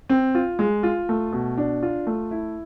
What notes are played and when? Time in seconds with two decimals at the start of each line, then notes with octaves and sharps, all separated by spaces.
0.09 C4
0.35 F4
0.59 G#3
0.83 F4
1.09 A3
1.32 B2
1.57 D4
1.83 F4
2.07 A3
2.31 E4